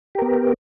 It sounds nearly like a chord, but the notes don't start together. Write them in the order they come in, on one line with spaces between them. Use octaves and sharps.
G4 A#4 B3